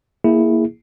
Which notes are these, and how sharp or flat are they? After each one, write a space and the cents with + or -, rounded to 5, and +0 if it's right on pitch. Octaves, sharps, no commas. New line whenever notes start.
A#3 +0 E4 +0 G#4 +0